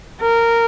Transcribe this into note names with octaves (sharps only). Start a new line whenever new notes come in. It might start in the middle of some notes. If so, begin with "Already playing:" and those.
A#4